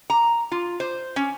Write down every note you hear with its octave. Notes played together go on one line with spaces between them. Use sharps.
A#5
F4
C5
C#4